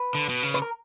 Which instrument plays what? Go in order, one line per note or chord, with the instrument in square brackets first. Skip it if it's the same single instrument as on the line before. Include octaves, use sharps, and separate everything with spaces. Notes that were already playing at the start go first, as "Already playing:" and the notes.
Already playing: [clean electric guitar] B4
[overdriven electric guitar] D3
B2
C#3
[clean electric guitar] B4
A#4